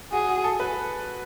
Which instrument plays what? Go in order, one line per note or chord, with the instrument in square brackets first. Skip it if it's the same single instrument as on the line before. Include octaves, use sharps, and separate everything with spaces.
[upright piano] F#4 [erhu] G#4
[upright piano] F#4
A4
B4